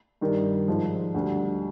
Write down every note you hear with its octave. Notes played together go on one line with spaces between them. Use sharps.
G2 D#3 G3
G#2 F3
D2 D3 G3